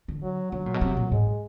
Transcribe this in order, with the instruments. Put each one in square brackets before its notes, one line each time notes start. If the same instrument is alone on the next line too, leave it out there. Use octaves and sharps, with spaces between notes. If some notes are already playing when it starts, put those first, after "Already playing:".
[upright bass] D3
[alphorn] F#3
[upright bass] D3 [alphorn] F#3
[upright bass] A#2
B2
C3
A#2
[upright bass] G#2 [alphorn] G#3